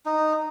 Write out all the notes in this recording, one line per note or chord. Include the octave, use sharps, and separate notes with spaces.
D#4